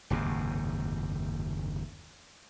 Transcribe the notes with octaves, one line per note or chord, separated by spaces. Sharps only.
F#1 D#2 G#2 C3